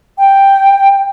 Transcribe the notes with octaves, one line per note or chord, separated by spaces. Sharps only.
G5